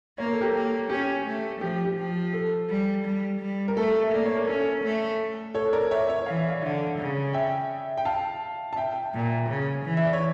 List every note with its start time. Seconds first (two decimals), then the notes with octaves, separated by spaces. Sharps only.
0.18 A#3 C#5
0.26 A#4
0.33 A4
0.41 G4 A#4
0.54 A#3
0.89 C#4 G4
1.25 A3
1.61 F3 G4
1.85 G4
1.98 F3
2.33 A4
2.69 G3
3.05 G3
3.41 G3
3.68 A#4
3.76 A3 A4
4.03 E5
4.12 A#3 D5
4.26 C#5
4.37 A#4
4.47 C#4 A4
4.83 A3
5.54 A4 C#5
5.73 A#4 D5
5.91 C#5 E5
6.08 C#5 E5
6.26 E3 F5
6.37 E5
6.49 D5 F5
6.62 D3
6.98 C#3
7.33 E5 G5
7.97 G5
8.05 F5 A5
8.73 A5
8.76 E5 G5
9.13 A#2
9.49 C#3
9.84 E3
9.97 E5
10.05 D5
10.13 C#5